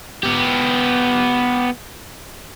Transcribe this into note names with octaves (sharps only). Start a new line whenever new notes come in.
B3 G4